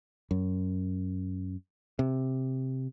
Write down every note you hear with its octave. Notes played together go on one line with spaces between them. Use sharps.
F#2
C3